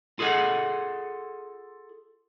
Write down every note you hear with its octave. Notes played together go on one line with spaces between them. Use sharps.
F4 G#4 A4 D#5 F#5